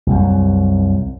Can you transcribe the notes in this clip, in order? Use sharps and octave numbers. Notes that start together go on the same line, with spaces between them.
C2 F#2